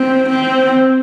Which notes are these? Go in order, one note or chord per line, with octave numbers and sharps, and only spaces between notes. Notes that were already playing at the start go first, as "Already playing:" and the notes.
Already playing: C4
C4